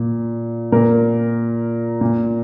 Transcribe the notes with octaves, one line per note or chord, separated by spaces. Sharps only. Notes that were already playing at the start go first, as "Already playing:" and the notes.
Already playing: A#2
A#2 A#4
A#2